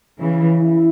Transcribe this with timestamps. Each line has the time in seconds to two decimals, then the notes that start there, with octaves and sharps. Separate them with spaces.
0.19 C#3 E3
0.60 E4